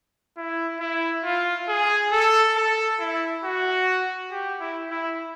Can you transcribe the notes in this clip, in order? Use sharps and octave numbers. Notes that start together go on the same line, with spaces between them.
E4
E4
F4
G#4
A4
A4
E4
F#4
G4
E4
E4